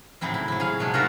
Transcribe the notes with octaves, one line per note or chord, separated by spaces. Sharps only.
A2 C#3 F#3 C4 E4
E4
F#3 E4
G#4 C#5 F5
C3 F#3 G#3 A3
F4 F#4 A4 A#4 E5 F#5